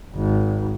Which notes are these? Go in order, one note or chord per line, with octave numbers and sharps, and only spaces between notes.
G#1